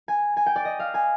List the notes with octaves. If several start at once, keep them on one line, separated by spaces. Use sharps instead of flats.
G#5
G#5
G5
D5
D#5
F5
G#5